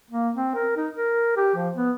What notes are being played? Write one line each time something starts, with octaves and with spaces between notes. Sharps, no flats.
A#3
C4
A#4
D#4
A#4
G4
F3
B3